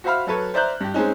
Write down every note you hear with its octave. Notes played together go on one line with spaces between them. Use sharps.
F#4 C5 E5 F5 B5 F6
F#3 A4 B4 C#5
C5 D5 E5 A#5 F#6 G6
G2 G4
G#3 C4 C#4 D#4